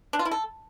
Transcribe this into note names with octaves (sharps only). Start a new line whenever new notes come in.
D4
F4
E4
A4